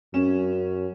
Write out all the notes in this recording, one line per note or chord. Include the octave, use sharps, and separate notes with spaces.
F#2 C#4 E7